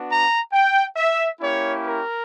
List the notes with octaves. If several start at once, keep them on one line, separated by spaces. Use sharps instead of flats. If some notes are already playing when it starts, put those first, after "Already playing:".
Already playing: B3 D4 F#4
A#5
G5
E5
A#3 C#4 E4 G4 C#5
A#4